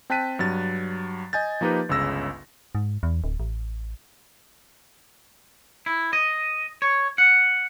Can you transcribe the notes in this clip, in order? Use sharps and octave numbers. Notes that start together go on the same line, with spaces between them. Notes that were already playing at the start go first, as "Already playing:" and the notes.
C4 G5 A5 F#6 B6 D#7
G2 F#3 A6
D#5 G#5 G6 A6
F3 A#3 D#4 G4 B4
G1 C#2 C#3 E6 A#6
G#2
E2
D1
A1
E4
D#5
C#5
F#5